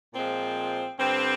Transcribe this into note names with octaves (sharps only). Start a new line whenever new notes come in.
A#2 F3 G#3 C4
G2 D3 G3 C4